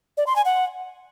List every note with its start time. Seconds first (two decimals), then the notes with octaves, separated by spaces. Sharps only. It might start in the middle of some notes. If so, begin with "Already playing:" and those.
0.17 D5
0.27 C6
0.36 G#5
0.45 F#5